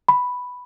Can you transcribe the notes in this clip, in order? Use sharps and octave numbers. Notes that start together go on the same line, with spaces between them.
B5